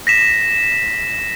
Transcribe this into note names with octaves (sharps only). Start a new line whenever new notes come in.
A#6 B6 E7